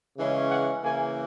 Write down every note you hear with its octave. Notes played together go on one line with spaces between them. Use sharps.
C#3 E3 G#3 C#4
F#5
C#3 E3 A#3 G#5